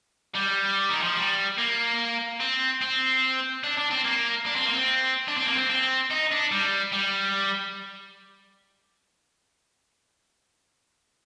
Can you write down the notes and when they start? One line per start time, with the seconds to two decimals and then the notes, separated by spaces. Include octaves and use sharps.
0.35 G3
0.89 D#3
1.03 F3
1.17 G3
1.58 A#3
2.40 C4
2.81 C4
3.64 D4
3.77 D4
3.91 C4
4.05 A#3
4.46 D4
4.56 C4
4.65 A#3
4.75 C4
5.28 D4
5.37 C4
5.46 A#3
5.55 C4
5.70 C4
6.11 D#4
6.31 D4
6.52 G3
6.92 G3